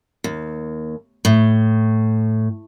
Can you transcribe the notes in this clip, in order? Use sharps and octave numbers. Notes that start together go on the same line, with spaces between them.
D#2
A2